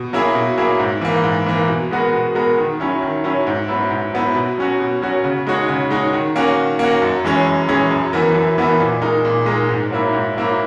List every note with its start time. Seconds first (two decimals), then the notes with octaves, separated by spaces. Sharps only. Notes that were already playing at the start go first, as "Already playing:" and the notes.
Already playing: B2
0.13 F#3 A#3 E4 G#4
0.35 B2
0.58 F#3 A#3 E4 G#4
0.79 G#2
1.01 E3 A#3
1.24 G#2
1.46 E3 A#3
1.68 B2
1.91 G#3 B3 F#4 A#4
2.13 B2
2.35 G#3 B3 F#4 A#4
2.58 D#3
2.80 F#3 C#4 E4
3.02 D#3
3.24 F#3 C#4 E4
3.47 G#2
3.68 F#3 B3 E4
3.91 G#2
4.13 F#3 B3 E4
4.35 B2
4.58 F#3 C#4 F#4
4.80 B2
5.02 F#3 C#4 F#4
5.24 C#3
5.47 G#3 D#4 F#4 C#5
5.68 C#3
5.90 G#3 D#4 F#4 C#5
6.13 D#3
6.36 A#3 C#4 F#4
6.57 D#3
6.79 A#3 C#4 F#4
7.02 F#2
7.25 E3 G#3 C#4 G#4
7.46 F#2
7.69 E3 G#3 C#4 G#4
7.91 F#2
8.13 E3 B3 E4 A#4
8.35 F#2
8.58 E3 B3 E4 A#4
8.80 A#2
9.02 G#3 D#4 A#4
9.25 A#2
9.46 G#3 D#4 A#4
9.69 G#2
9.91 F#3 A#3 E4
10.13 G#2
10.36 F#3 A#3 E4